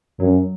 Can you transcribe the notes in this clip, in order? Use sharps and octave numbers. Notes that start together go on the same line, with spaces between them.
F#2 F#3